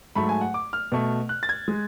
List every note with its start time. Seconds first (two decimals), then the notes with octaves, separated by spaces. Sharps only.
0.16 G#2 F#3 A3 B5
0.29 G#5
0.41 F#5
0.54 D6
0.73 F6
0.92 B2 A3
1.29 F#6
1.43 A6
1.49 G#6
1.68 G#3